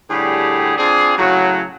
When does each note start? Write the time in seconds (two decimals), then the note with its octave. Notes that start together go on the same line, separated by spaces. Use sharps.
0.10 A2 D3 G3 G4 G#4
0.78 C4 D4 F4 G#4
1.17 A2 C#3 F#3